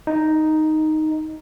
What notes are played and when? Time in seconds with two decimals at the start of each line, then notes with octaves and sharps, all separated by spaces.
0.07 D#4